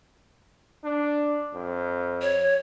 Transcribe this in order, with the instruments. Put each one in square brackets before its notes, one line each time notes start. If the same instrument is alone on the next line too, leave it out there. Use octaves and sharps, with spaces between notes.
[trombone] D4
F2
[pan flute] C#5